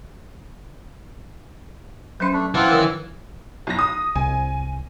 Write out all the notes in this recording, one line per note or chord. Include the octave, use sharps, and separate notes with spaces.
F#3 C#4 B4 C5
A3 D4
E3 C4 F4 F#5 A5
D3 D#3 A#4
B1 A#6
D#6
C2 G#5